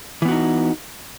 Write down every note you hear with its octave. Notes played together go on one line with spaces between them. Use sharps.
E3 B3 D#4 F#4